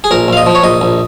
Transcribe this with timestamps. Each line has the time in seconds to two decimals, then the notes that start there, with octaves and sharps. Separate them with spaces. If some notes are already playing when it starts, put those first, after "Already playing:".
0.04 G#4
0.11 A#1 A#4
0.28 A#1 F5
0.37 D#5
0.46 F3
0.55 C#5
0.64 A#1 D#5
0.81 A#1